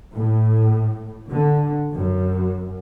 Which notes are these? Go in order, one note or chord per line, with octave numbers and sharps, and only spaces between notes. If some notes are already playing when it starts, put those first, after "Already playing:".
A2
D3
F#2